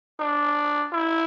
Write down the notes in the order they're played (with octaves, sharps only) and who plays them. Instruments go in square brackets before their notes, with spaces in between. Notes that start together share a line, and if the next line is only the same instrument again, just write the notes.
[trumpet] D4
E4